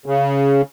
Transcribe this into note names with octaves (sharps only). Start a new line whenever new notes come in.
C#3